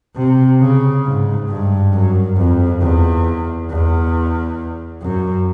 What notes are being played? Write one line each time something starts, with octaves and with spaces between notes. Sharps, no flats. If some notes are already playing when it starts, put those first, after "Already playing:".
C3
C#3
G#2
G2
F#2
F2
E2
E2
F#2